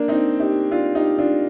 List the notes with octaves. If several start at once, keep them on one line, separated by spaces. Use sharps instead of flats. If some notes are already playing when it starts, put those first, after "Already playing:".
Already playing: A#3 D4
C4 D#4
D#4 G4
D4 F4
D#4 G4
D4 F4